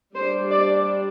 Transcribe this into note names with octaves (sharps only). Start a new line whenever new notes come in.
G3 D4 C5
D5